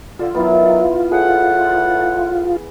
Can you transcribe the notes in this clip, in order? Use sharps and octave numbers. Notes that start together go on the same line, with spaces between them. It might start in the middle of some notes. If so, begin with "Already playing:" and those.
D3 F4 E6
D#3 F#3 B3 E4
A2 A3 G#4 F#5